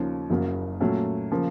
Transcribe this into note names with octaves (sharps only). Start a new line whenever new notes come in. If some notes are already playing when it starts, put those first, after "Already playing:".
Already playing: D#2 C#3 F3 A#3 C#4
F#1 F#2 C#3 F#3 A#3
A#2 F#3 A3 C#4
C#3 F3 A#3